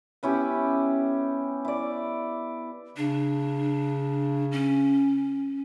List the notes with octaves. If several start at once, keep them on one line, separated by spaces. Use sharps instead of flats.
B3 C#4 E4 G4
E4 D5
C#3 D4
C#4